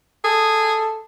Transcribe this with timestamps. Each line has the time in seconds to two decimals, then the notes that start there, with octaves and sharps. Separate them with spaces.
0.25 G#4 A4